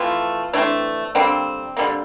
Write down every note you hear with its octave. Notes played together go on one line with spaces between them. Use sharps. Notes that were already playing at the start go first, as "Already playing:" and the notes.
Already playing: E3 F3 A3 C4 F4
E3 A3 C4 D4
D3 G3 A#3 C4
D3 G3 A#3